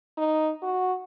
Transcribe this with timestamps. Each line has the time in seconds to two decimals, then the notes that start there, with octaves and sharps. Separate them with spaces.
0.18 D#4
0.63 F#4